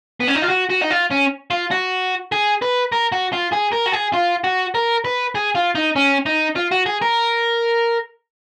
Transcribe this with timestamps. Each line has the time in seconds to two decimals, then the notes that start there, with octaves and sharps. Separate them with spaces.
0.21 B3
0.28 C#4
0.35 D#4
0.43 F4
0.50 F#4
0.70 F#4
0.82 D#4
0.91 F4
1.11 C#4
1.51 F4
1.71 F#4
2.32 G#4
2.62 B4
2.92 A#4
3.12 F#4
3.33 F4
3.53 G#4
3.73 A#4
3.87 F#4
3.93 G#4
4.14 F4
4.44 F#4
4.75 A#4
5.05 B4
5.35 G#4
5.55 F4
5.75 D#4
5.96 C#4
6.26 D#4
6.56 F4
6.71 F#4
6.86 G#4
7.02 A#4